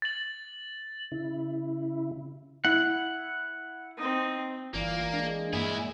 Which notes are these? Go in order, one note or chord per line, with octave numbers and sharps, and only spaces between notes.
A6 F#7
C#3 E4
E4 F#5
C4 D#4
G1 E3 A#3 F4 D5
G#3 D4
G2 A#2 E4 G#4